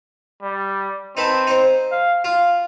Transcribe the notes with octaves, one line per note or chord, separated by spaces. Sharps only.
G3
C4 D#4 B4 A5
D#4 C5
F5
F4 F5